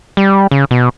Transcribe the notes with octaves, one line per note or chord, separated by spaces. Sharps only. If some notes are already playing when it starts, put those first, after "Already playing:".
G3
C#3
B2